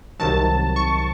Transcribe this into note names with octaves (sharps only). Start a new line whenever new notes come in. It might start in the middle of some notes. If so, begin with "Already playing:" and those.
C2 C3 D#3 F#3 A5
C#6